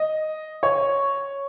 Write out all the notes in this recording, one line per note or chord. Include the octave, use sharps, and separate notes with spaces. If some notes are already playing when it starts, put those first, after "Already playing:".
Already playing: D#5
C#5